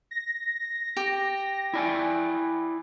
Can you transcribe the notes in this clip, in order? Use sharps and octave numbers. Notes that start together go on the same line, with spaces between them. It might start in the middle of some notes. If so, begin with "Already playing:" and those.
A#6
G4
E4 D5 G#5